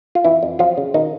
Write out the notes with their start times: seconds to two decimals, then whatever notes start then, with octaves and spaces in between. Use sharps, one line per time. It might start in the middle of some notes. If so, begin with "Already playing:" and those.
0.15 F4
0.25 F2 E3 E4
0.43 F2
0.59 F3 F#3 F4
0.78 C#3
0.94 B2 D#3 D#4